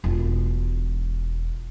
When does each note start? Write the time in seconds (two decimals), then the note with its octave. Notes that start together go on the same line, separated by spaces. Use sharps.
0.04 E1 F4